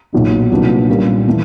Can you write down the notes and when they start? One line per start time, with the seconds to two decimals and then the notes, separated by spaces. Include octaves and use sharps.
0.13 B1 A#2 F#3 A#3 D#4
0.51 C2 A#2 F#3 B3 D4
0.89 A#2 G3 A#3 C#4
1.28 E3 A3